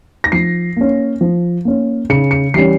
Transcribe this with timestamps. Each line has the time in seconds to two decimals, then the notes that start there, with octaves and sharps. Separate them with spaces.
0.24 A#6
0.32 F3 C7
0.77 A#3 C#4
1.21 F3
1.65 A#3 C#4
2.10 C#3 C#7
2.31 C#7
2.54 E3 G3 C#4 C7